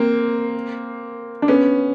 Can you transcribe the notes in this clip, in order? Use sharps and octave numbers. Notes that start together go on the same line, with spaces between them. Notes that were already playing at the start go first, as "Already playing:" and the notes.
Already playing: A#3 C4
D4
B3 C#4